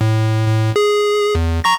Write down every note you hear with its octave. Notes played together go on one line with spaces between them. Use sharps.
A2
A2
G#4
E2
A#5 C#6 A#6